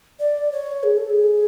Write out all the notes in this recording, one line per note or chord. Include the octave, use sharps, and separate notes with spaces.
D5
C#5
G#4
A4
G#4